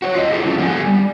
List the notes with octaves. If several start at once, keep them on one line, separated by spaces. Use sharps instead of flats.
F#4 C5 C#5
F4 D#5
E4 G#4 A4
F3 A3 C#4 E4 F4 A4
B3 G4 A4 E5 F#5 G#5
G3